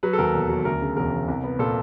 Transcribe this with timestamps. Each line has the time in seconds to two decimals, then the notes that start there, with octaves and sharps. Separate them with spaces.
0.03 F#3 B4
0.13 A4
0.18 D#2 A#4
0.34 E1
0.49 F#3
0.65 D2 A#4
0.81 C#3
0.97 E1 A#4
1.12 E1
1.28 C2
1.44 B3
1.59 A#2 A4